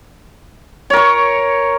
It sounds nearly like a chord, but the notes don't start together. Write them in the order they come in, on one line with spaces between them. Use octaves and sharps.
C#5 A#4 C#6